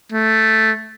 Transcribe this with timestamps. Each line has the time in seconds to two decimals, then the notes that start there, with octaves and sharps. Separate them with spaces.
0.12 A3